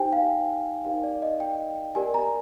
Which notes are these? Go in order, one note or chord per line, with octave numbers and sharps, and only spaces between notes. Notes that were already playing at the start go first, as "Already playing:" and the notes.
Already playing: D#4 G4 C5 G5 G#5
F5
D#4 G4 A#4 D5 F5
D5
D#5
G5
G4 A#4 D5 G#5
A#5